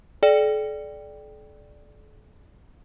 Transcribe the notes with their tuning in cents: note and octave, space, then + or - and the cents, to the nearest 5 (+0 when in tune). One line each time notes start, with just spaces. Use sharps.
A4 -45 D5 +0 G5 +0